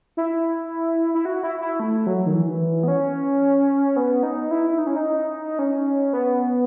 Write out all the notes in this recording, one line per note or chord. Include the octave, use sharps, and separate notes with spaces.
E4
E4
F#4
E4
E4
A3
F#3
D#3
E3
B3
C#4
B3
D#4
E4
D#4
C#4
D#4
C#4
B3